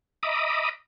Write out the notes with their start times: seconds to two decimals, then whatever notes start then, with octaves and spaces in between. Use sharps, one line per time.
0.23 D#5 E5 A#5 B5 D6 D#6